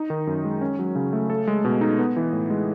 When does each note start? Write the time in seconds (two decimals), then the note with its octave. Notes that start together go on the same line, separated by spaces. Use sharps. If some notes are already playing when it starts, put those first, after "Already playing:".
Already playing: D#4
0.10 D#3
0.27 F#2
0.44 G#3
0.61 C#4
0.79 F#3
0.96 C#3
1.13 A3
1.30 A4
1.47 G#3
1.65 B2
1.81 D#4
1.99 B3
2.16 E3
2.33 A2
2.50 G#3